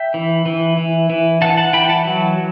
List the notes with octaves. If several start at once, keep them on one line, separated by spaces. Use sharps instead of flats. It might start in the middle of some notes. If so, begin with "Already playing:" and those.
Already playing: E5 G5
E3
E3
E3
E3
E3 F#5 A5
F#5 A5
E3 G5 B5
F#5 A5
F#3